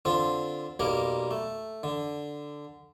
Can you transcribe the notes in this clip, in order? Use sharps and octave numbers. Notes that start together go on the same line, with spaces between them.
D3 C4 F4
B1 G3 A#3 A#4
A3
D3